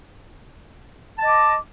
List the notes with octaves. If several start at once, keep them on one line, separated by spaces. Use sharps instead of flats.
D#5 A5 D6